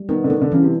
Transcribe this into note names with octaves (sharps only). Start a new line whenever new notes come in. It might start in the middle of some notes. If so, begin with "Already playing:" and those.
Already playing: G3
D#3 B3
D3
D#3 D4
D3
C#3 E3
C3